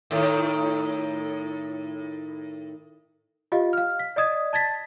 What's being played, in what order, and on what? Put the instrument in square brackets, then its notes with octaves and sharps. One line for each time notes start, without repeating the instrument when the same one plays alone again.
[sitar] A2 D#3
[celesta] F4 G4 D#5 F5
F5 F6
B6
D5 D#5 D#6 G#6
A5 G#6 A6 B6